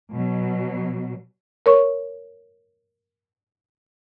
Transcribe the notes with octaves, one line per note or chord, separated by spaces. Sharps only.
B2 F#3
A#4 C#5 C#6